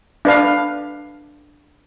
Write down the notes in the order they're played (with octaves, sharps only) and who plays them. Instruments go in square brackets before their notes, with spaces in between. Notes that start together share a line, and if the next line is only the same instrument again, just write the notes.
[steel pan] D4 B4 F5